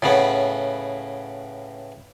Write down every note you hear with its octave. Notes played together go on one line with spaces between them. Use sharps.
A2 C#3 B3